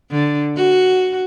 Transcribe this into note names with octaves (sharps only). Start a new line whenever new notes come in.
D3
F#4